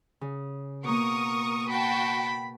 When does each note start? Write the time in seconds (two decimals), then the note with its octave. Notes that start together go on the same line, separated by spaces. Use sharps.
0.21 C#3
0.84 B2 A#3 A#4 C#6 D#6
1.69 F#4 G5 A5 B5